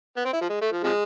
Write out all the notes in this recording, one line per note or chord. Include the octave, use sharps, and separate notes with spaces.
B3
C4
E4
F3
G#3
A3
F3
C3 F3 G#3